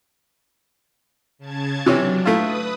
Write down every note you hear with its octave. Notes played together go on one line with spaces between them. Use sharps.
C#3 A5 G#6
C3 E3 F#3 C#4 D4
A3 E4 F4 B4 D#6